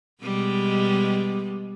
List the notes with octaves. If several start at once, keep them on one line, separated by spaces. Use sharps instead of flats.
B2 G3 G#3